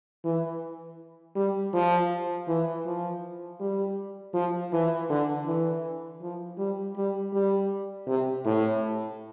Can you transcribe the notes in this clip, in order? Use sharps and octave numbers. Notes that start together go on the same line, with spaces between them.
E3
G3
F3
E3
F3
G3
F3
E3
D3
E3
F3
G3
G3
G3
C3
A2